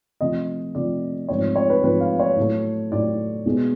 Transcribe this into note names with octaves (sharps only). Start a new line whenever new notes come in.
C3 F3 A3 D#5
C3 F3 A3 D5
G#2 F3 A3 C4 C#5
C#5
B4
G#2 F3 A3 C4 B4
F5
C#5
A2 F#3 A3
A2 F#3 A3 D5
B2 G#3 B3